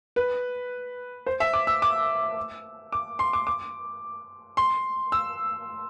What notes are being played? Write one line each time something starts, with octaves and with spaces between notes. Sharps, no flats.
B4
C5
E5
D6
E6
D6
D6
C6
D6
D6
C6
E6